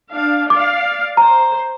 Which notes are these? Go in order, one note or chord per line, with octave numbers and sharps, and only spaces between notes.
D4 F5
D5 F5 D6
C5 A#5